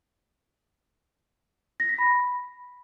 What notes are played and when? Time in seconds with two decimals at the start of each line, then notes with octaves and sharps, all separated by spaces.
1.80 A#6
1.89 B6
1.98 B5